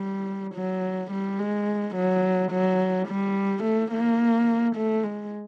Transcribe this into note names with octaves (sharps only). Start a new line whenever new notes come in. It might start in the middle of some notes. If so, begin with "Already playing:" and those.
Already playing: G3
F#3
G3
G#3
F#3
F#3
G3
A3
A#3
A3
G#3